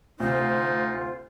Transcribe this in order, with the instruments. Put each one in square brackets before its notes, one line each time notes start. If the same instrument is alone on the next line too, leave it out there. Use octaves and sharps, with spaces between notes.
[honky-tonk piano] D2 C3 [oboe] D#4 [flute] F4 [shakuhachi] C5